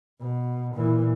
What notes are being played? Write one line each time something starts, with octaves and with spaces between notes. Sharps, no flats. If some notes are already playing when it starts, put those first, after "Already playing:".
B2
A#2 E3